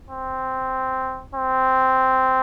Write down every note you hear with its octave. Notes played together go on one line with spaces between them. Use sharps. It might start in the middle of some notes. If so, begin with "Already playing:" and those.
C4
C4